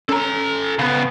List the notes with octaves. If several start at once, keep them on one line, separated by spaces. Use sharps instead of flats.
C#4 A4 A#5
C#3 B3